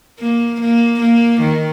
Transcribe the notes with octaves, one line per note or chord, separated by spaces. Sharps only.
A#3
A#3
A#3
D#3